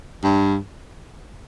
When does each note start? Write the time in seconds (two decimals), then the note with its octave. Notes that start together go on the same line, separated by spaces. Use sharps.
0.23 G2